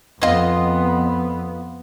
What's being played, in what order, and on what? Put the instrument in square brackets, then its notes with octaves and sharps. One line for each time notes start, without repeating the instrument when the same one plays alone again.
[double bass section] F2 B3 [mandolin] F4 D#5